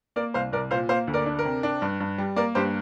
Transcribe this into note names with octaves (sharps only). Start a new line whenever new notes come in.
A#3 A#4 D5
C2 C5 F5
C2 A#4 D5
A#2 C5 F5
A#3 C5 F5
D2
A#4 D5
D4
A#4
C3
D4
G2
G2
G3
A#3 A#4 D5
G2 G4 C5